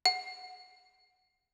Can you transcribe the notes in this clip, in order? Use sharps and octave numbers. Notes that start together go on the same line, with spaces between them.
F#5